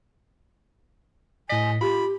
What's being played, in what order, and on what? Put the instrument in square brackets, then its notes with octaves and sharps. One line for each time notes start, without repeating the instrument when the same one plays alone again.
[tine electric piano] A2 B6 [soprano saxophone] D#5 [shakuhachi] G#5
[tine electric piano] F4 [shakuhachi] G4 [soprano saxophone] B5